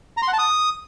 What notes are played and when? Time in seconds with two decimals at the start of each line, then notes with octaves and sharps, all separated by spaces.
0.17 A#5
0.22 C6
0.28 F#5
0.33 A5
0.38 D#6